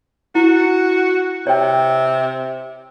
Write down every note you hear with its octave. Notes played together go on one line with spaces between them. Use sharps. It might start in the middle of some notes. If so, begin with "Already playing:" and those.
E4 F#4
C3 C#5 G5